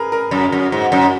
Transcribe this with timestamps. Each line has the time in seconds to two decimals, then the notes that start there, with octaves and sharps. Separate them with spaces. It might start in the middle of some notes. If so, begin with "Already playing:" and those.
Already playing: G#4 A#4 B4
0.12 A#4
0.31 F#2
0.52 F#2
0.72 G#2
0.92 F#2